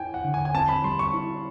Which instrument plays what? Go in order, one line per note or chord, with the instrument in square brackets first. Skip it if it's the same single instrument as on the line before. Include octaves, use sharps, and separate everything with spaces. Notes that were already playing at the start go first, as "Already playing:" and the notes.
Already playing: [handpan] E4 [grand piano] G5 G#5
[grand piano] F#5
[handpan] D3
[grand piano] G#5
G#5
[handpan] C4 [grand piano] A5
[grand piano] B5
[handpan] G3 [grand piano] C6
[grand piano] C#6
[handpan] E4